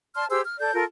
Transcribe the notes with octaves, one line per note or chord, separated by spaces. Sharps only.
D5 A5 C6 F6
G4 G#4 C5 E6
F6
A4 D5 G6
F4 A4 A#4